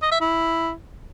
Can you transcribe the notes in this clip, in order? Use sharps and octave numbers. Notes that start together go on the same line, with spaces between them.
D#5
E5
E4